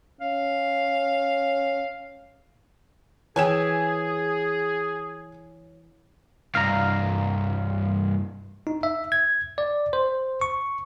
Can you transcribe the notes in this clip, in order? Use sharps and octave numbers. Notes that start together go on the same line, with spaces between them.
C#4 F5
E3 G#4 C#5 E5 G5 G#5 G#6 E7
C2 G2 F5 A#5
D#4
E5
G#6
D5
C5
C#6